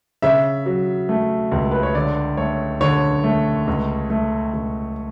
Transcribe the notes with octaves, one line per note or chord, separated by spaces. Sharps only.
C#3 E5
F#3
A3
C#2
B4
C#5
D3 D5
A3 C#5
D3 C#5
A3
C#2
A3
C#2